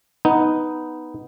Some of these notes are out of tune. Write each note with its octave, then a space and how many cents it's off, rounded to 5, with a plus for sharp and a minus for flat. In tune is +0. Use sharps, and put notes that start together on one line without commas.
B3 +0 D#4 +5